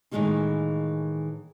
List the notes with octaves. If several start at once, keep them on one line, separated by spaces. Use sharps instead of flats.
A2 D#3 E3 G#3 A#3 D#4